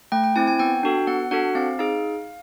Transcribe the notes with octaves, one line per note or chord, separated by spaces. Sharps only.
A3 G5
G5
C4 E4 G#5
G#5
B3 G5
D4 F#4 A4
B3 F#5
D4 F#4 A4 F#5
C4 F5
D#4 G#4 F5